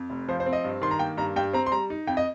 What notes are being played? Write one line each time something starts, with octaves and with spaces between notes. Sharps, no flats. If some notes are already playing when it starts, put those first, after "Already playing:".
Already playing: F2
F1
F3 C5
C5
C4
D#5
G2
D#3 C6
A#5
A#3 G5
G2 A#5
G2 G5
C4 A#5
C6
G3 A#5
D#4
F2 G5
D#5